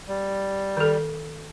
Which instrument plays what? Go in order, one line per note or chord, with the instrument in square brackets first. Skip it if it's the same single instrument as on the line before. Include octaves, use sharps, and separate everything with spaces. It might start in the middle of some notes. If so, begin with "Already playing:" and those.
[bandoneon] G3
[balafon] D#3 A4